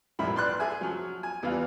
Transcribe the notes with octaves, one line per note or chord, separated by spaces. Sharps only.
A#1 G2 F3 G3 E4 B5
B4 D5 C6 F#6
G#4 E5 G#5
F3 F#3
G#5
E2 E3 G3 F4 F5